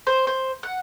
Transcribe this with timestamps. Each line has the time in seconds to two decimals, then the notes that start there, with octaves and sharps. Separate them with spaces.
0.07 C5
0.27 C5
0.63 F#5